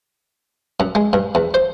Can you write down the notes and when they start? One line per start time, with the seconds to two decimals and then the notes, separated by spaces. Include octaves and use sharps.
0.80 F#2
0.95 G#3
1.13 G2
1.35 E2
1.54 C5